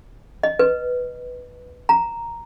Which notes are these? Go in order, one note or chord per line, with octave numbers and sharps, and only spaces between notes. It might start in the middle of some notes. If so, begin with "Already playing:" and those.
D#5
B4
A#5